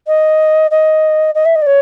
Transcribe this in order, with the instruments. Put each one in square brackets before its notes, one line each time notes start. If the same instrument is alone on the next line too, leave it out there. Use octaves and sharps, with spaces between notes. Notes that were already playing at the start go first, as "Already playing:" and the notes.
[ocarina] D#5
D#5
D#5
E5
D#5
D5
C#5